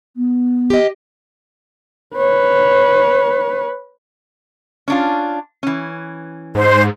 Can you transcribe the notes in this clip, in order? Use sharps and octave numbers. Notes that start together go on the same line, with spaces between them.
B3
G4 D#5
B4 C#5
C#4 D4 F4
E3 C#4
G#2 C5